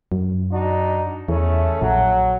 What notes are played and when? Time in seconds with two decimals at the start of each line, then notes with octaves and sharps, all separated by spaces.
0.12 F#2
0.52 D4 D#4 F#4
1.29 E2 C#3 A3
1.81 A#1 F#3